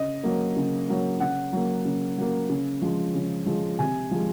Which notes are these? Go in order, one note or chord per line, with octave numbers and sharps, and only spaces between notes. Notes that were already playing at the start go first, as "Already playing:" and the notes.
Already playing: C#3 D#5
F#3 A#3
C#3
F#3 A#3
C#3 F#5
F#3 A#3
C#3
F#3 A#3
C#3
F3 G#3
C#3
F3 G#3
C3 G#5
F3 G#3